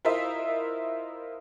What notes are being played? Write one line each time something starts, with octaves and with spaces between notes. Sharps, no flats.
E4 F4 A#4 C5 D#5 E5